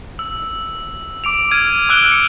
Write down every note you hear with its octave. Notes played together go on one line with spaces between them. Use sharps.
E6
D6 D7 F7
F6 G#6 D7 D#7
D6 E6 F#6 D7 E7 G7
C#7